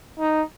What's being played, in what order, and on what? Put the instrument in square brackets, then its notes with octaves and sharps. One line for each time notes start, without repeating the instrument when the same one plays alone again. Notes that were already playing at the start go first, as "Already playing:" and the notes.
[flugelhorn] D#4